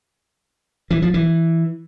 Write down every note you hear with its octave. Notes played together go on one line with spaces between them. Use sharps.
E3
F3
E3